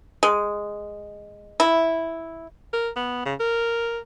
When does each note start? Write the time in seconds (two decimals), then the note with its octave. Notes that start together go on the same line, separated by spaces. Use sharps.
0.23 G#3
1.60 E4
2.73 A#4
2.96 B3
3.26 C#3
3.40 A#4